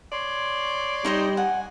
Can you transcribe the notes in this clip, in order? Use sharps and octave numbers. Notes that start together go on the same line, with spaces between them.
C#5 D5 C6
G3 D#4 C5 D#5
F#5 G#5